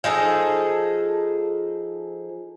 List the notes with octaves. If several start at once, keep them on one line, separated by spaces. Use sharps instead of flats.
F3 D#4 G#4 A4